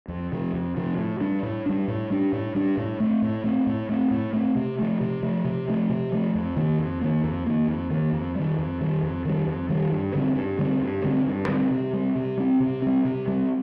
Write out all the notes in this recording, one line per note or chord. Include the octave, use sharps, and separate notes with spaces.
F2
C3 F3
F2
C3 F3
A2
G3 D4
A2
G3 D4
A2
G3 D4
A2
G3 D4
A2
A3 C4
A2
A3 C4
A2
A3 C4
A2
A3 C4
C3
F3 A3
C3
F3 A3
C3
F3 A3
C3
F3 A3
F2
D#3 A#3
F2
D#3 A#3
F2
D#3 A#3
F2
D#3 A#3
F2
D#3 G3
F2
D#3 G3
F2
D#3 G3
F2
D#3 G3
G2
D3 G3 C4
G2
D3 G3 C4
G2
D3 G3 C4
G2
D3 G3 C4
C3
G3 C4
C3
G3 C4
C3
G3 C4
C3
G3 C4